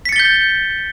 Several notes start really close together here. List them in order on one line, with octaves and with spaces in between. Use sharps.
B6 C#7 A6 G7 G6